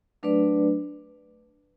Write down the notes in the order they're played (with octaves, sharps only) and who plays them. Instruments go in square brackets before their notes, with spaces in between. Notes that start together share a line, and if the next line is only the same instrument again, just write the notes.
[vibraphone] F#3 A3 D4 B4 D5